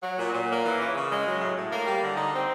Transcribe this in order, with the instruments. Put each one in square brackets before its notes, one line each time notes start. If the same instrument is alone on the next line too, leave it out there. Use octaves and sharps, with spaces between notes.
[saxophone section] F#3
A#2
A#2
A#3
E3
C#3
C#3
G#3
F#3
A2
A2
A#3
G3
D3
D#4
C4